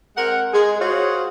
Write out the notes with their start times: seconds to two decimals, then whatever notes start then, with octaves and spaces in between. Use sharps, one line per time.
0.16 G#3 C4 A#4 F#5
0.54 G#3 G#4
0.81 F4 F#4 G#4 C5 C#5 F5